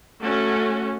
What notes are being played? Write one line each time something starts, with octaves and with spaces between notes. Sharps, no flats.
A3 C#4 F#4